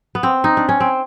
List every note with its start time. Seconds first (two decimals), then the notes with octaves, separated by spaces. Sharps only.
0.15 B3
0.23 C4
0.44 D#4
0.57 D4
0.69 C#4
0.80 C4